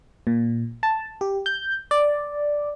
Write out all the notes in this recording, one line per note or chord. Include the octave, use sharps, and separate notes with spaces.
A#2
A5
G4
G6
D5